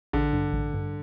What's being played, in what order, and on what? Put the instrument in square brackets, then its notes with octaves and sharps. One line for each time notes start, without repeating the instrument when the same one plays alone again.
[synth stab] A1 [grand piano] D3
[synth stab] G2
A1
G2